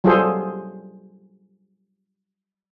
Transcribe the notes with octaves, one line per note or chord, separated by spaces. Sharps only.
F#3 G3 F4 G#4 A4 C5